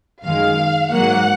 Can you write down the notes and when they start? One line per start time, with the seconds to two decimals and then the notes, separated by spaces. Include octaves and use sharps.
0.23 F#2 D#3 G#3 F5
0.90 G#2 F#3 A#3 F#5